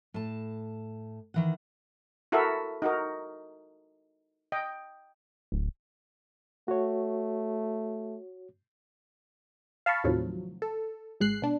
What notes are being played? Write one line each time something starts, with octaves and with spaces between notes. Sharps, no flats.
A2 A5
D#3 E3 F#5
E4 F#4 A4 A#4 E5
D#4 F#4 A#4
D#5 G5
D1
A3 F#4 C#5
F5 A5 B5 C#6
D#2 A2 C3 D#3 F3 F#3
A4
G#1 G#3 F#6 C7
B2 D4